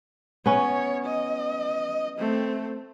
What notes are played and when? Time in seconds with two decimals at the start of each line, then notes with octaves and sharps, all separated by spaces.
0.46 B3 C#4 C#5
1.05 D#5
2.18 A3 C4